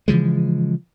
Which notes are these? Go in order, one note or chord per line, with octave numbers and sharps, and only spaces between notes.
C#3 E3 F3 G#3